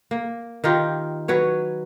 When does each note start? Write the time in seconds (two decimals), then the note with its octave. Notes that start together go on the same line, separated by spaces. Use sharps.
0.11 A#3
0.64 D#3 D#4 F4 G4
1.28 F#3 B4 C#5